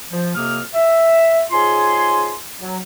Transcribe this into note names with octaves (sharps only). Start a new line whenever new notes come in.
F3
F2 C3 A#3 D#6 F6
E5
G#2 F4 G#4 C#5 G#5 C6
F#3